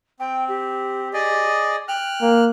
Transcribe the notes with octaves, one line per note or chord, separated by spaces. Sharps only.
C4 G5
G4
G#4 D5 D#5
G5 F6 F#6
A#3